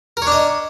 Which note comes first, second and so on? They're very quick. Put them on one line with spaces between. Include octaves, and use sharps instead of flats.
A#4 C#5 D4 D#5